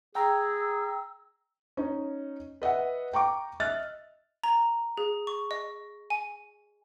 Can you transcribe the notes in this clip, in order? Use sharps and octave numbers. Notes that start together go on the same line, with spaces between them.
G#4 G5 A#5 E6
C#4 D#4
B4 D#5 E5 F#5
G5 A#5 C#6 D6
D#5 E5 F6 F#6 A6
A#5
G#4
C#6
D#5
G#5